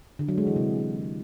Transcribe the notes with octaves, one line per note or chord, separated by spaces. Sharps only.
D3
F#3
G#3
E3
C3